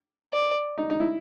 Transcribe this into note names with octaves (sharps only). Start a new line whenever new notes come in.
D5
D#4
D#4
E4